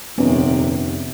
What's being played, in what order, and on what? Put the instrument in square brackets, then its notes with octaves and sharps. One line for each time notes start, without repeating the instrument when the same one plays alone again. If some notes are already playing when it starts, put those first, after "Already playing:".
[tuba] D#1 [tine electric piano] F2 D#4 [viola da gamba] C3 [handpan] B3 C#4